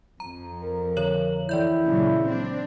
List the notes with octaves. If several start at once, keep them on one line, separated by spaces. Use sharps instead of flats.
F2 A#5
A#4
D3 C#5 F#7
E3 E4 D5 G6
A#2 C#3 F#3
C4 D4